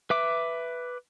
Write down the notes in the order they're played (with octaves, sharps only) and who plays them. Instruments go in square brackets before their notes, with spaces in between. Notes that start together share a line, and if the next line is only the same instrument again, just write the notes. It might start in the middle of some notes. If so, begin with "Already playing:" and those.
[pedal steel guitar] B4 E5 D6